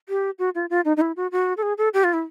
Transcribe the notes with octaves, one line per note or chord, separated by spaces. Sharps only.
G4
F#4
F4
F4
D#4
D#4
E4
F#4
F#4
A4
G#4
A4
G4
F4
E4